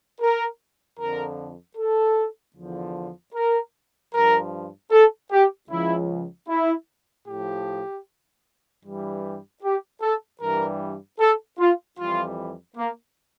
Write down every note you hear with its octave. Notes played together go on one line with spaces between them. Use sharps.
A#4
F2 D3 F3 A#4
A4
E2 D3 F3
A#4
G2 F3 A#4
A4
G4
C#2 C#3 F3 E4
E4
A2 F3 G4
G2 E3 G3
G4
A4
G2 E3 G3 A#4
A4
F4
F2 E3 G3 F4
A#3